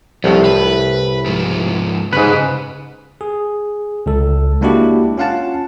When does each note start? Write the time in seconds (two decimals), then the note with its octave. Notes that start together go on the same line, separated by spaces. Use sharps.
0.24 C2 A2 F3
0.45 B4
1.26 G#2 F3
2.13 G#2 C#3 B4
3.21 G#4
4.06 C#2 A4
4.61 G#3 A#3 D4 E4 F#4 G4
5.18 C#4 F4 F5 F#5 A5